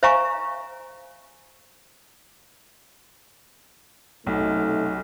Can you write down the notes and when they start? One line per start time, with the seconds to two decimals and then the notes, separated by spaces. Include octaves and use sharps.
0.03 C5 E5 F5 G#5 A#5 C#6
4.27 B1 F#2 C3 A3 D#4